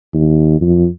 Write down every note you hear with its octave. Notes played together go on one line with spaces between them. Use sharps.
D#2
F2